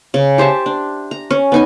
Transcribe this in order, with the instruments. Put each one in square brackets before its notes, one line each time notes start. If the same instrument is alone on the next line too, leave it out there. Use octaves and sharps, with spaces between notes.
[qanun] C#3
G4 C5 E5 A5
D4
A#5
C#4
B3 D#4 G#5